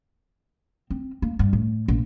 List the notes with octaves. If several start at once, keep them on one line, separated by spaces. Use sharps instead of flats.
C4
A#3
G2
A2
A#1